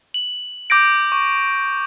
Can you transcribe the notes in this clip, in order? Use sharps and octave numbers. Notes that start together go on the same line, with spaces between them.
F#7
D6 G6 A#6 D7
C#6